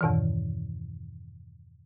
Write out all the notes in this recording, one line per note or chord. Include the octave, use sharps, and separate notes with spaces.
E2 G2 B2 D#3 E3